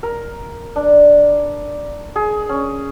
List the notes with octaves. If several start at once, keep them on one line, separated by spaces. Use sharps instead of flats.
A#4
D4
G#4
C#4